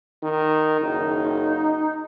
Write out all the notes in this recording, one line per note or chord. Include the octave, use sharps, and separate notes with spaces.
D#3
F#1 D#4